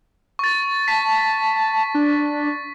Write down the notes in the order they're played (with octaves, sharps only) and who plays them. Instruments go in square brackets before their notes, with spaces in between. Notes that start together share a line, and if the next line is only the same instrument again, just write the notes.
[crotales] C#6 A6
[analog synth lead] A5 [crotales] B6
[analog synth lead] D4